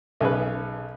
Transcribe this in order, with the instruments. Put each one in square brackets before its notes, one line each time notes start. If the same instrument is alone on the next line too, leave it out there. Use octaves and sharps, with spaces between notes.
[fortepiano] B1 C#4 G#4 B4